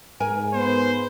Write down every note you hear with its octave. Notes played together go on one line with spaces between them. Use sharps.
G#2 A#4 G#5
B3 C5